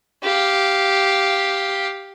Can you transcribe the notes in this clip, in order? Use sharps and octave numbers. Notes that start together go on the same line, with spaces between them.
G4 F5